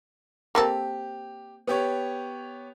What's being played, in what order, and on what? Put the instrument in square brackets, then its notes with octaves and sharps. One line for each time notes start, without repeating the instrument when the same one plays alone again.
[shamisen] A#3 C4 A4 [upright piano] G4
[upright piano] B3 G4 C#5